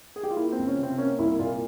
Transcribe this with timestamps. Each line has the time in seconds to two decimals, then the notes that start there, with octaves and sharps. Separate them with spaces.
0.16 G#4
0.23 G4
0.31 F4
0.37 A#3 E4
0.52 C4
0.58 C#2
0.68 C#4
0.78 C3 C4
0.98 A#3 C#4
1.18 C2 E4
1.39 A#2 F4